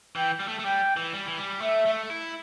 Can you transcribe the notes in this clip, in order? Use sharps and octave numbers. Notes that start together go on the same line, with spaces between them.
E3 G5
G3
A3
A3
G3 G5
E3
G3
E3
G3
A3 E5
A3
E4